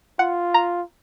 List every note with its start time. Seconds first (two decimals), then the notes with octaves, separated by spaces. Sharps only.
0.19 F4 F#5
0.54 A#5